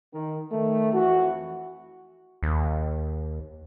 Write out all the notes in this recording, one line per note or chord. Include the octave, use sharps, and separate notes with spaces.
D#3
D#3 A3
F2 E3 F#4
D#2